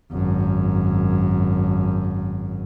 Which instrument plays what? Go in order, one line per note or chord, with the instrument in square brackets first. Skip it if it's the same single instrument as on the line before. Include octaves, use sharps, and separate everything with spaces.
[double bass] G#1 F#2